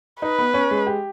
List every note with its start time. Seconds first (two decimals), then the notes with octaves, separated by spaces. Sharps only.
0.21 D#4 B4
0.39 B3
0.54 C#4
0.71 G#3
0.87 G4